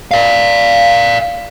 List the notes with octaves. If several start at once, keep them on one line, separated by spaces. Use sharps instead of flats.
D5 F5